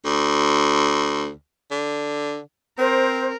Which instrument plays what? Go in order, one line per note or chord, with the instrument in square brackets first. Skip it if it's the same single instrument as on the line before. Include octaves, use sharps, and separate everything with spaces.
[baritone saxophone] D2
D3
[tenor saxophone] C4 [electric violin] A#4 [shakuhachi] C5